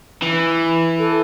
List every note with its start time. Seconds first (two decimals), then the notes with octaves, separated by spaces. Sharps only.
0.22 E3
0.99 A4